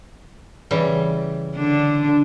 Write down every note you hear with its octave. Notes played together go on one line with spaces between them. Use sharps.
C#3 E3 G3
D3 D4